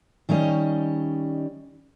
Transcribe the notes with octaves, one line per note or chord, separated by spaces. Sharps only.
D#3 G3 C#4 D#5